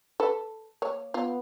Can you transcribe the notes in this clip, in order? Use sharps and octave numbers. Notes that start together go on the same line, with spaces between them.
A4 B4
A#3 C#5
B3 F4